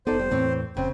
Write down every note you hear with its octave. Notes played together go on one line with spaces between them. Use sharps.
F1 B3 D#4 A4 C5 D5
G3
E2 A2 E3 C4 C#5
F1 C#3 C4